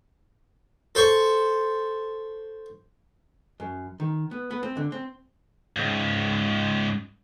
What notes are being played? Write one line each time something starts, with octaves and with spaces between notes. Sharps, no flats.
A4 C5 C#6
F#2
D#3
B3
B3
C4
D3
C4
C#2 G#2